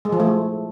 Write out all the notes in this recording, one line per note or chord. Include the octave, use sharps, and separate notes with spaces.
G#3
F3
A3